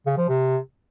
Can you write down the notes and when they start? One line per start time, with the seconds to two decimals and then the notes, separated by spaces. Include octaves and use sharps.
0.06 C#3
0.17 F3
0.28 C3